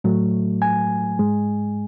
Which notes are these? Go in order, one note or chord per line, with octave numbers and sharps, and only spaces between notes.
A2 F#3 A3
G#5
G#2 G#3